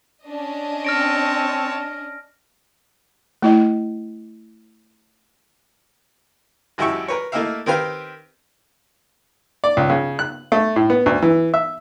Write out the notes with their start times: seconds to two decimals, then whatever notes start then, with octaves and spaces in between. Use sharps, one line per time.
0.24 C#4 D4 D#5
0.85 C4 C#5 A5 F6 A#6 D7
3.42 A3 E4 D#5
6.78 G#1 F#2 E4 G4 E5 C#6
7.08 A#4 B4 C#5
7.32 A3 A#3 D#4 E4 E5 F5
7.66 D#3 C4 G4 B4 F5
9.64 D5
9.77 C#2
9.90 C#3
10.19 F#6
10.52 A3
10.76 A2
10.90 B3
11.06 D2
11.22 E3
11.54 E5